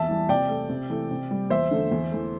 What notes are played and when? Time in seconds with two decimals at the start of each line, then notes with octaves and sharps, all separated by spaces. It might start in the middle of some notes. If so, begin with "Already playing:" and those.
Already playing: E2 E5 A5
0.09 E3 G3
0.29 C3 D5 G5
0.49 A3
0.69 C3
0.90 E3 A3
1.11 C3
1.31 G3
1.50 E2 C5 E5
1.71 D3 A3
1.91 E2
2.12 E3 A3